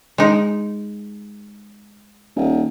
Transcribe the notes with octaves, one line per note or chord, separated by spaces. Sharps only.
G#3 D#4
D#1